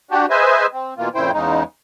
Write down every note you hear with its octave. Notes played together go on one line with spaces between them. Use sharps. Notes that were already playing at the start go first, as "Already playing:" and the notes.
D4 F#4 G4
G#4 B4 C5 D#5 E5 G#5
C4
B2 E3 A#3 F4
F2 A#2 C#3 E4 C5 G5
E2 C#3 G#3 D#4